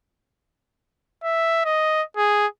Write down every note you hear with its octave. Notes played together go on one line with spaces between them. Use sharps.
E5
D#5
G#4